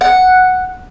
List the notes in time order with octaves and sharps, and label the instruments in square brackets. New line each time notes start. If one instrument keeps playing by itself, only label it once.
[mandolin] F#5